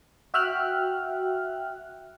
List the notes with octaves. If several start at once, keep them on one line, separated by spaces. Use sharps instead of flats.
F#4 E5 G5 F6 F#6